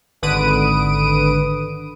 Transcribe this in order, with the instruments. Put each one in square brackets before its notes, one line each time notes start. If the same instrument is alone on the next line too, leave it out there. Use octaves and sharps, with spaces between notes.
[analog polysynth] G#1 D3 B4 D#6 D7 D#7